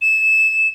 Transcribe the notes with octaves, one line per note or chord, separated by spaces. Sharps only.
E7